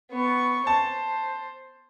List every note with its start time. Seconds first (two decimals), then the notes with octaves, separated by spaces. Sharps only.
0.11 B3 C#6
0.67 C5 A5